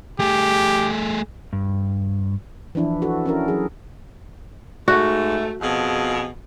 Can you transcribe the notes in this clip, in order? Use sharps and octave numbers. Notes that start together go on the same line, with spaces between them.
A3 G4 G#4
G2
E3 F3 D4 E4
F#4 A4
C#4 E4 A#4
F#3 G#4
G#2 A3 F#4
F2 B2 G#4